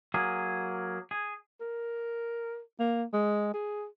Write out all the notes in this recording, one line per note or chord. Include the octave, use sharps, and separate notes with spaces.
F#3 A#3 G#4
G#4
A#4
A#3
G#3
G#4